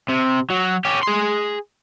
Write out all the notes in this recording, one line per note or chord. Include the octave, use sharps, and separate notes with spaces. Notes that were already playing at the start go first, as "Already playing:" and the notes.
C3
F#3
C#4 G4
G#4 C6